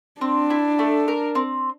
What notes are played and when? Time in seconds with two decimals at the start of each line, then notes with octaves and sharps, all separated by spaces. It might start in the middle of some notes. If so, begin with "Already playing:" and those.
0.21 C4 D4
0.50 E4
0.79 A3
1.08 A#4
1.35 C4